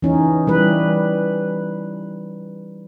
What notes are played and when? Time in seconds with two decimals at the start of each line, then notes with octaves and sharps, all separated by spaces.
0.02 E3 C#4 D#4
0.47 E3 G3 B4